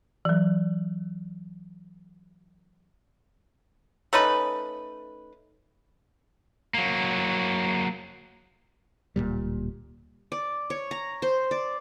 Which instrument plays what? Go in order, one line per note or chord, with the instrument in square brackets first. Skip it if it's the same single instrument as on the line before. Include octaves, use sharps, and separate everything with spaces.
[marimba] E3 F#3
[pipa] A3 C#4 D#4 B4
[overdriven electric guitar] F#3 A#3
[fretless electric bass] D1 C2 A#2 G3
[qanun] D5
C#5
A#5
C5
D5